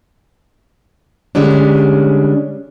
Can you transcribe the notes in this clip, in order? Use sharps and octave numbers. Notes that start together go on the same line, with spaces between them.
D3 G3 G#3 C#4 D4